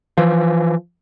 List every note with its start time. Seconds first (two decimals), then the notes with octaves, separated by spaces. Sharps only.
0.18 E3 F3